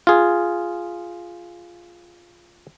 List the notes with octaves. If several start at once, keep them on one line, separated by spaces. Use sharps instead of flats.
F4 G#4